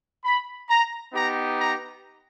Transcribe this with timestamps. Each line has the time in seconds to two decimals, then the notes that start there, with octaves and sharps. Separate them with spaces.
0.24 B5
0.69 A#5
1.13 B3 D#4 G4 A#5
1.58 A#5